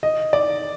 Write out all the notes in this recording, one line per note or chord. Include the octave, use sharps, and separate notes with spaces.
D#5
D5